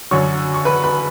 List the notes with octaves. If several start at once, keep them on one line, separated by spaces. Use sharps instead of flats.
F#2 D3 F#3 C#5 C#6
C#6
B4 B5
B4 B5